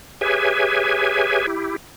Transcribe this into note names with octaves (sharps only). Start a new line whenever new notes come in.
G4 G#4 B4 C#5 E5 G#5
E4 G4